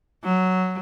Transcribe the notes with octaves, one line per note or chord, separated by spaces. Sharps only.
F#3